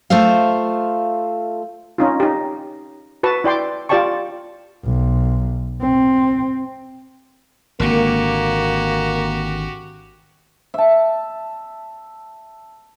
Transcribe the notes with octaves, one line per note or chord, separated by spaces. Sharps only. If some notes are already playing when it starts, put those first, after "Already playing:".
A3 F4 C5 E5 F5
C#4 D#4 F4
D#4 G4
F#4 B4 A5
E4 D5 G5 C6 D6
F4 G4 D5 G5 A5 C#6
B1
C4
G#1 D3 A#3 F#4 G4
E5 A5